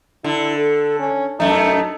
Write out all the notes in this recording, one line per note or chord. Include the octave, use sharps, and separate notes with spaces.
D3 E4
A4
C#4
F#2 A3 D#4